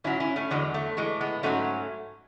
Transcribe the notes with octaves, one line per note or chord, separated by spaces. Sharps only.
G#2 F#3 C#4 E4
C#4 E4
A3 C#4
E2 D3 F#3 G#3
A3
A2 E3 G#3
G#3 B3
G#2 F#3 A3 C#4